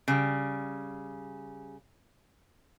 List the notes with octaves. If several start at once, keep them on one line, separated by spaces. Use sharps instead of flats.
C#3 G3